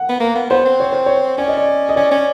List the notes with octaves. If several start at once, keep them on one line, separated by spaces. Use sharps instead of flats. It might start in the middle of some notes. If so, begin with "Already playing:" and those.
Already playing: F#5
B3
A#3
B3
B3 C5
C4
C#5
C5
C#5
C#4 D5
D#5
D5
D#5
C#4 D5
C#4